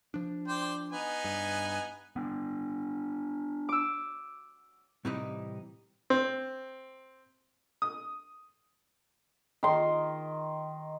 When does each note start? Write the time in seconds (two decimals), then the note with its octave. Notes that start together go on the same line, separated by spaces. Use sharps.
0.14 F3 D4
0.48 C5 D5 G5
0.92 B3 D#4 G#5
1.24 G2
2.16 B3 D4
3.69 D6 E6
5.05 A2 C3 E3 G3 C4 D#4
6.10 C4
7.82 D#6
9.63 D#3 C6